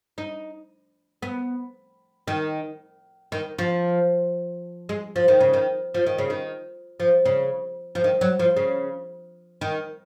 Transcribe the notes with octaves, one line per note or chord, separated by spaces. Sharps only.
D#4
B3
D#3
D#3
F3
G#3
F3
D#3
C#3
D#3
F3
D#3
C#3
D#3
F3
C#3
F3
D#3
F#3
F3
C#3
D#3